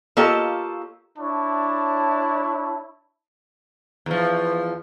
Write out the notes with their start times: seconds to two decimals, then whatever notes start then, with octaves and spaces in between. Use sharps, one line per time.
0.17 A#3 F4 G4 A4 C#5 D#5
1.18 D4 E4 C#5 A5
4.06 E2 F3